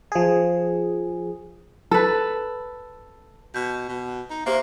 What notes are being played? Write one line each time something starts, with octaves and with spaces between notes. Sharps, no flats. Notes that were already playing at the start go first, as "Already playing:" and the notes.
F3 G#4
A4 B4
B2 G6
B2
D#4
A#3 G4 C5 E5